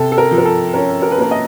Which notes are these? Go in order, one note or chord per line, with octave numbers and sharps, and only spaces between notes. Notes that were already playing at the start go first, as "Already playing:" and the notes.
Already playing: C3 A4
A4
A#4
F3
A#4
A4
C#4 A#4
A#4
B4
A#3 A#4
D#5